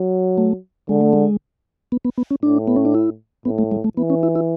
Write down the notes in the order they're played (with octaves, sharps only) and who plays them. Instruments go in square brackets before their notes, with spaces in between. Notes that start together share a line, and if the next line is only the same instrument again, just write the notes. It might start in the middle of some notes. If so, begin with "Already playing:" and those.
Already playing: [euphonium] F#3
[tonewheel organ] A3
[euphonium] D3 [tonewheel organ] G#3
[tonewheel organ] A3
G#3
B3
B3
B3
C#4
[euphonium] A2 [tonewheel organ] D4
[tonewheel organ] B3
C#4
D4
E4
[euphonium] A2 [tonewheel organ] B3
[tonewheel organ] A3
G#3
A3
[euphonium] E3 [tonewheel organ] B3
[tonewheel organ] C#4
E4
E4